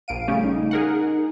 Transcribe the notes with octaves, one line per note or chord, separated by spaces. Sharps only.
A#1 F5 D7 D#7
C#3 G3 A3 C#4
D#4
G#4 A#4 F#5
D#4